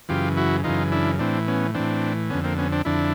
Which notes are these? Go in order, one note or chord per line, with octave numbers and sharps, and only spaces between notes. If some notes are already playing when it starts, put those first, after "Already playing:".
F#2 C#3 E3 F4 G4
E4 F#4
F#2 C#3 E3 D#4 F4
D4 E4
A2 E3 C4 D4
B3 C#4
A2 E3 C4 D4
F2 D3 B3 C#4
A#3 C4
B3 C#4
C4 D4
F2 D3 D4 E4